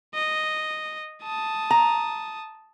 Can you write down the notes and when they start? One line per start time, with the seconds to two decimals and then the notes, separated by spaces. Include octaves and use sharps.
0.14 D#5
1.23 A5 D#6
1.71 A#5